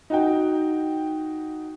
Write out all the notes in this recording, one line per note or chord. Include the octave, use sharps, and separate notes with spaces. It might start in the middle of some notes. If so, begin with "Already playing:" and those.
D#4 F#4 G5